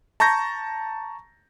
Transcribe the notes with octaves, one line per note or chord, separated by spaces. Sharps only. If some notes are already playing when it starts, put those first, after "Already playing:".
A5 A#5 C#6 G6 A#6